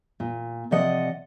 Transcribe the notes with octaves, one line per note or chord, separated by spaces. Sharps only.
A#2
C3 F3 D5 D#5 F#5